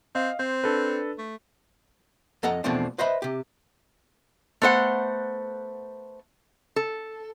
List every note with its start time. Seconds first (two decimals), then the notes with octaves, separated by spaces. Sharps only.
0.15 C4 D#5 F5
0.39 C4 C5
0.64 D4 A4 B4
1.18 A3
2.43 F2 A4 D#5 F#5 A#5
2.64 E2 B2 F3 A3 C4 D4
2.98 B4 C5 D#5 E5 B5
3.22 C3 G4
4.62 A3 B3 C5 D#5 F#5
6.76 A4